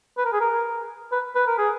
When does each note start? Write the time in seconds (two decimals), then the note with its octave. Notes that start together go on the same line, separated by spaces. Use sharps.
0.17 B4
0.25 A#4
0.33 G#4
0.41 A#4
1.12 B4
1.35 B4
1.47 A#4
1.58 G#4